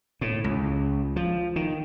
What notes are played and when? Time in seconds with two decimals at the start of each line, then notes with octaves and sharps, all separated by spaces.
0.21 A2
0.44 C#2
1.16 F3
1.56 D#3